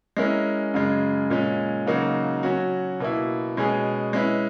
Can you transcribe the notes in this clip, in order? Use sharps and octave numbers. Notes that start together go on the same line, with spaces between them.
G#3 C#4 E4 A#4
F#2 C#3 G#3
A#2 G#3 C#4
C#3 F#3 A#3 D#4 F#4
F#3 C#4 F#4
B2 A#3 E4
B2 G#3 C#4 G#4
G#3 C#4 E4 B4